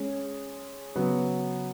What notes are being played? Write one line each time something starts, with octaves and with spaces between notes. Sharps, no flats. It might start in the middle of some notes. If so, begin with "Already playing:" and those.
Already playing: G#3 C#4 G#4
C#3 F#3 B3